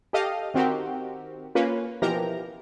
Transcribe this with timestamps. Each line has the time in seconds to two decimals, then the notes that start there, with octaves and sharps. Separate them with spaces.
0.13 G4 A4 D#5 F5
0.54 D#3 C4 F#4 G4 A#4
1.55 A#3 C#4 F4 B4
2.02 B2 E3 F3 G4 A#4 A#5